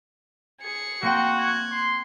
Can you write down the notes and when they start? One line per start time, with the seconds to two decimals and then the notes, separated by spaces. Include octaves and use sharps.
0.60 G#4 C#7
1.03 A#3 C4 F#4 G5
1.37 F#6 G#6
1.72 C6